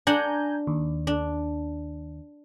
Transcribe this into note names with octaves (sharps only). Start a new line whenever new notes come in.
D4 F#5 G#5 A#5 G6
D#2
D4